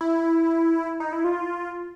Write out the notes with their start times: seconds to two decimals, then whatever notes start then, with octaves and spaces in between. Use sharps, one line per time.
0.01 E4
1.00 D#4
1.13 E4
1.24 F4